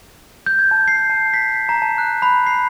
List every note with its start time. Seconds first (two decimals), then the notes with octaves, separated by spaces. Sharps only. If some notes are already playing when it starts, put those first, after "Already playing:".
0.46 G6
0.59 G#6
0.71 A5
0.88 C7
1.10 A5
1.34 B6
1.69 A#5
1.82 A5
1.98 F#6
2.22 B5
2.46 C7